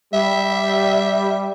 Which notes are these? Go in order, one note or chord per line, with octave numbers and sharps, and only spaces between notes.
G3 E5